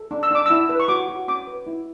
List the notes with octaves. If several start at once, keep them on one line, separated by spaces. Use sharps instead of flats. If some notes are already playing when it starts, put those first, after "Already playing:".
Already playing: A4
D4
E6
D4 D6
E4 E6
B4
C#6
F#4 D6
F#4
C#4 D6
B4
E4